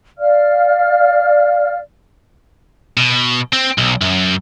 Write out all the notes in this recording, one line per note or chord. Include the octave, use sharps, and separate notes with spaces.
D5 F5 F6
B2
C4
B1
F#2